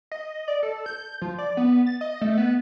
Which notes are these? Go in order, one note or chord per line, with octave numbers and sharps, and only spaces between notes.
D#5
D5
A4
G6
F3
D5
B3
A6
D#5
A3
B3